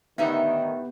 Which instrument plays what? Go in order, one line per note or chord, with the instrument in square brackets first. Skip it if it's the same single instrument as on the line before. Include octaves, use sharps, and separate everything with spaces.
[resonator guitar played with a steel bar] A2 D#4 E5 [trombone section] D3 D#3 [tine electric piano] B3 G4 B4